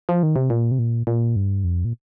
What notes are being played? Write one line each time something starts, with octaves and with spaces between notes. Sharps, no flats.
F3
D#3
C3
A#2
C3
A#2
A#2
G2
F2
A#2